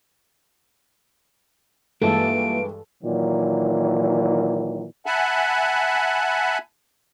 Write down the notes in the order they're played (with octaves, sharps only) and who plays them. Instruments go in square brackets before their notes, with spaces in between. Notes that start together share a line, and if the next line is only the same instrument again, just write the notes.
[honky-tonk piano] G2 E3 G#3 [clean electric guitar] A#3 E4 F4 [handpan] A4 [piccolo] D7
[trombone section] A#2 D#3 E3 F#3
[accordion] E5 F#5 G#5 A5 B5